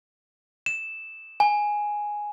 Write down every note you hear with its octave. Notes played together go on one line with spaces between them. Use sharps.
E7
G#5